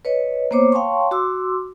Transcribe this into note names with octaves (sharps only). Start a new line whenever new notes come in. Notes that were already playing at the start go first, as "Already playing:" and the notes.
B4 C#5 D#5
A#3 B3 C5 C#5 D6
C#5 F5 G5 A5 C6 C#6
F#4 C6 D6 E6